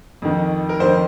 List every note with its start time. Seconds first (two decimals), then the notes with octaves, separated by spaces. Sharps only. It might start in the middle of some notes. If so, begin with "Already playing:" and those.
0.22 F2 D#3
0.69 A#4
0.80 F2 D#3 C5